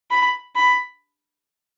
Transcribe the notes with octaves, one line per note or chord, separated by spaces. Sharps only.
B5
B5